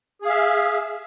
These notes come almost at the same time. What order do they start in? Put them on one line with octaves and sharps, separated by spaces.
G#4 F5 E5